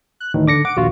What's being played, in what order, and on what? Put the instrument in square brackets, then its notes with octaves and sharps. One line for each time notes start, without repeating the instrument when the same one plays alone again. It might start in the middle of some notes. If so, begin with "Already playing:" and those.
[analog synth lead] F#6
[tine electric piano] D2 A2 E3 [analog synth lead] D#3
[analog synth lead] D3 [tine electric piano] D6 A#6 C#7
[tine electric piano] F#5 D6 [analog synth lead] D7
[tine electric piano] A#1 D#2 F4 [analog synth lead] F#4